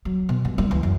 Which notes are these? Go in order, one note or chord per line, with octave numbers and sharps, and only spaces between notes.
F#3
B2
G2
G3 A#3
C#2 E3
F#2